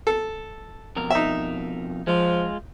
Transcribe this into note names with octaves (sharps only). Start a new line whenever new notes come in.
A4
F2 B2 A#4
D#4 E5
F3 G#3 F4